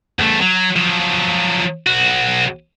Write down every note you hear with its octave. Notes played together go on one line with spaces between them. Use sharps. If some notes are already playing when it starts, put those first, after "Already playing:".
E2 A3
F#3
F3 F#3
B1 F#4